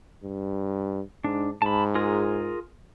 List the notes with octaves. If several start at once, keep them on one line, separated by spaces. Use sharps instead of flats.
G2
G#2 D4
G#2 A5 B5
F4 G#4 A#4